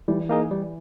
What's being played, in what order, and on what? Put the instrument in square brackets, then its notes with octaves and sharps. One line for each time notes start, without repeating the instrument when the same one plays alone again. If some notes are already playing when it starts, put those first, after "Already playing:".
[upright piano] E3 [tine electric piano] G3
[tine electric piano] A#3 D#4 G#4
G3